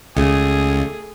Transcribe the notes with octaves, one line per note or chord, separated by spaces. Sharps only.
C#2 A3 G#4